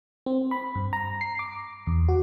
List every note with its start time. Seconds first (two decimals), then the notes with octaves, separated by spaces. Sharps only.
0.26 C4
0.51 B5
0.75 G2
0.93 A#5
1.21 C7
1.39 D6
1.87 E2
2.09 F#4